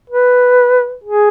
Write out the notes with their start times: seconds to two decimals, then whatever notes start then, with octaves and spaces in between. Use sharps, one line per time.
0.10 B4
1.04 G#4